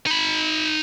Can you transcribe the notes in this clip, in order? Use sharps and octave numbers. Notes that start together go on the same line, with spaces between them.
D#4 B5